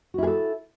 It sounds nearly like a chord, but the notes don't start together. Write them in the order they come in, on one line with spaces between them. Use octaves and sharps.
F#4 E4 G#4 A4